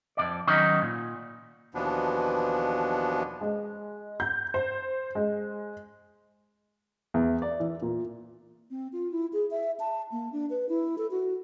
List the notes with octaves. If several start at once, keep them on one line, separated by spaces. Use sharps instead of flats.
F2 C3 D5
D#3 F#3 B3 C#4 D#4
A#2
D#2 B2 E3 F3 B3 D4
G#3
G6
C5
G#3
E2
D5
E3
A#2
C4
F4
E4
G#4
E5
A5
A#3
D4
B4
E4
A4
F#4